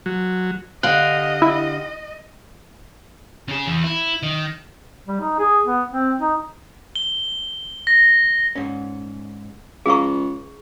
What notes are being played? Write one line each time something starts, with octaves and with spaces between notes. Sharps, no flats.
F#3
D3 G4 D#5 F5 F#6
E4
C#3 G#4
E2
E4
D#3
G3
D#4
G#4
B3
C4
D#4
G7
A#6
G#2 C#4
C#2 G#4 E5 F5 A#5 C#6